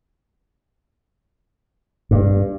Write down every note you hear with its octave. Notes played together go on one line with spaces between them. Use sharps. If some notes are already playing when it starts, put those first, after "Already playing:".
G2